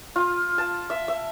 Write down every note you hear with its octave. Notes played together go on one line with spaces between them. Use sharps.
F4
A5
E5
E5